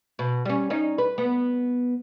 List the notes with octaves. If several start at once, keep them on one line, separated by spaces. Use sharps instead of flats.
B2
G3 C#4
C#4 D#4
B4
B3